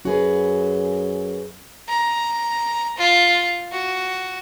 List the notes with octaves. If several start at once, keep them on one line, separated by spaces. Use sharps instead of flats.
F#2 F#4 G#4 B4
A#5
F4
F#4